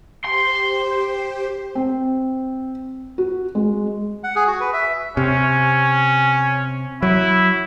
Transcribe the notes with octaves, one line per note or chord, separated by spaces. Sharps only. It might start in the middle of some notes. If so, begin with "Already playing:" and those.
G4 C5 C6
C4
F#4
G#3
F#5
G#4
F#4
B4
E5
C3 C#4
F#3 E4